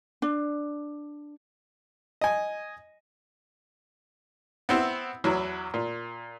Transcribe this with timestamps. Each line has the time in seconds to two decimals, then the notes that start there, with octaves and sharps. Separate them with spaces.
0.22 D4
2.21 D#5 G#5
4.69 B3 C4 E4
5.24 E2 F#3 E4
5.74 A#2